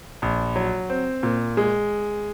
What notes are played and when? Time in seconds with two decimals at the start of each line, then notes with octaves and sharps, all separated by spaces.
0.22 A#1
0.56 F#3
0.90 C4
1.23 A#2
1.57 G#3